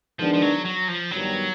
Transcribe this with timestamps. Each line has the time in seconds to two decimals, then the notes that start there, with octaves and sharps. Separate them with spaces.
0.18 D#3 F3 G#3 B3 D4
0.34 F3
0.42 F#3
0.65 F#3
0.88 F3
1.11 G2 D#3 F#3 G3 B3